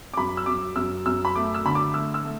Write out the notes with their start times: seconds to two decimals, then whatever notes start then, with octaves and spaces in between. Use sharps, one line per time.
0.14 D6
0.17 F#2 B5
0.37 E6
0.46 F#2 D6
0.76 F#2 E6
1.06 F#2 E6
1.25 B5
1.35 A3 D6
1.54 E6
1.65 D3 B5
1.75 D6
1.94 A3 E6
2.14 E6
2.24 A3